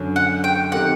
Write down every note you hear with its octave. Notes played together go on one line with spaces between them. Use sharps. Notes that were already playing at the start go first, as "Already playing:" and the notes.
Already playing: F#2 D3 F#3
F#5
G5
D#3 A3 C4 G4 A#4 F#5